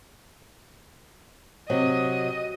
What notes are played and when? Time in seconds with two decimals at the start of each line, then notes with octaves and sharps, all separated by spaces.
1.70 C3 F#3 D#5